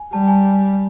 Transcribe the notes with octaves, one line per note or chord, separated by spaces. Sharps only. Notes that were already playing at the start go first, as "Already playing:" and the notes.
Already playing: G#5
G3 A5
G#5